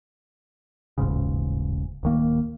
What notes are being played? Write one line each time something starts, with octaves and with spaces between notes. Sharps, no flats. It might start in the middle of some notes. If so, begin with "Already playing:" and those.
D#1 A1 G#2 C#3
D1 D#3 A#3